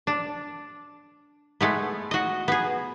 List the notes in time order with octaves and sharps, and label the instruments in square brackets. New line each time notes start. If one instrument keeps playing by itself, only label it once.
[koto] D4
G#3 A3 B3
F#4 D#5
B3 G#4